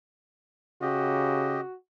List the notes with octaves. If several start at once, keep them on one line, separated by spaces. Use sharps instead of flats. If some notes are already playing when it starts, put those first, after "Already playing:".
C#3 F#4 G4 D#5